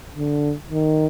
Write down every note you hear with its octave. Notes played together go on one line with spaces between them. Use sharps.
D3
D#3